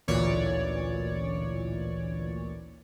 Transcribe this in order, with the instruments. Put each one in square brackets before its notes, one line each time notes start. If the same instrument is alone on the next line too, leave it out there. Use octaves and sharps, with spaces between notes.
[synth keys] A1 D2 A#2 E3 C#5 D5